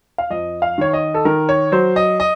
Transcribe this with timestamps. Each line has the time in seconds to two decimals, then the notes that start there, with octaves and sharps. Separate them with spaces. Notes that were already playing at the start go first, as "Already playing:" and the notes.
0.18 F5
0.30 F2 D#5
0.62 F5
0.78 D#3 C#5
0.93 D#5
1.14 A4
1.25 D#3 A#4
1.49 C#5
1.72 F#3 C5
1.96 D#5
2.20 D#5